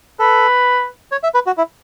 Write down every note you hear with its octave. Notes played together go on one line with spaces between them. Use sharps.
A4 B4
C#5
E5
B4
F#4
E4